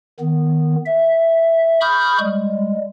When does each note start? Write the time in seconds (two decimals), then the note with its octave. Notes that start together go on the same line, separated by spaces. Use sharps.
0.20 D#3 B3
0.86 E5
1.81 B5 C#6 D#6 F6 G6
2.20 G3 G#3